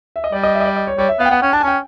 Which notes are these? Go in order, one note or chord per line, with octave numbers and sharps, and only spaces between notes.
E5
D#5
G3 D5
D#5
E5
D#5
D5
D#5
C#5
G3 C#5
E5
B3 F5
G5
B3 F#5
C#4 G5
D4 A5
G#5
C#4 G5